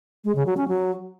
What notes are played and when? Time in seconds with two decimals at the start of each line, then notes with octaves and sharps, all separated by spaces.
0.24 G#3
0.35 C#3
0.46 F#3
0.57 C#4
0.68 F#3